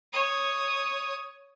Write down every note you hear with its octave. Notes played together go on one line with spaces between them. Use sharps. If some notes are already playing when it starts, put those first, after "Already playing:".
C#5 D#6